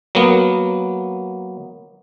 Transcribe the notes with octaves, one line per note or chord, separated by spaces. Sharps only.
F#3 A#3 B3